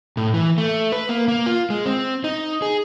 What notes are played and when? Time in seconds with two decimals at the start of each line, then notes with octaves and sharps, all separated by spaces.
0.17 A2
0.34 E3
0.58 A3
0.92 B4
1.09 A#3
1.28 A#3
1.46 F4
1.70 G#3
1.86 C4
2.24 D#4
2.62 G#4